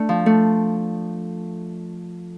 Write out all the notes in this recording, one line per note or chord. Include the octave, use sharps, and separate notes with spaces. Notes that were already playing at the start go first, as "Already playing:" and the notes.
Already playing: A3 D4
F3
A3